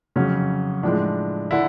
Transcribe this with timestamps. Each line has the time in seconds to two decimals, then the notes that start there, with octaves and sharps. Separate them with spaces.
0.16 F2 C#3 F#3 C#4
0.83 A2 F3 G#3 D4
1.51 D3 E4